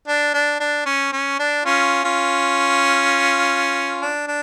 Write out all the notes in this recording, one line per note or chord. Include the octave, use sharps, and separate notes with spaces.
D4
D4
D4
C#4
C#4
D4
C#4 F4
C#4 F4
D4
D4